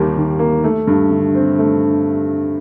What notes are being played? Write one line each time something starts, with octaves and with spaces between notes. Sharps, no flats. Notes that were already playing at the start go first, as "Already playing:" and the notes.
Already playing: D#2 D#3 G3 A#3
D#3
A#3
A3
G2
D3
C4
A3